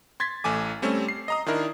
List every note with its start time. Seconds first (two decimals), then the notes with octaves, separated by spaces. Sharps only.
0.20 C6 G#6 A6 B6
0.44 A1 A3 G#5 D6
0.82 G3 A3 C4 C#4
1.09 C7
1.28 D#5 A#5 D#6
1.46 D#3 D4 E4 A#4